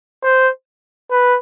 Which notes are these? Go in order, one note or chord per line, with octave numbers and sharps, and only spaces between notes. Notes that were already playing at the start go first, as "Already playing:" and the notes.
C5
B4